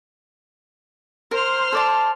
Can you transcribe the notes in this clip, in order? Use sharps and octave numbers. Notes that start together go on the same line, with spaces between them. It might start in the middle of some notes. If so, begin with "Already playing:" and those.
A#4 C5 C6 F6
A4 D5 A5